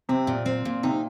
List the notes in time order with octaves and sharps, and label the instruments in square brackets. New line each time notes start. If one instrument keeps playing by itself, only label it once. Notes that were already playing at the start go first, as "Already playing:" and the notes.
[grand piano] C3 [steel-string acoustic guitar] C4
[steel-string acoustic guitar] A#2
C4
A#2
[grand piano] C3 [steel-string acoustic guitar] D#4